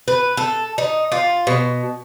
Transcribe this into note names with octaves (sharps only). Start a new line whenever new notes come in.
B4
A4
D#4
F4
B2